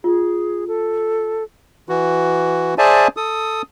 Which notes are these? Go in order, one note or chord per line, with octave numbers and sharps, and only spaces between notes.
F4 G#4
A4
E3 F#4
G#4 C5 D5 E5 G#5 A5
A4 D#6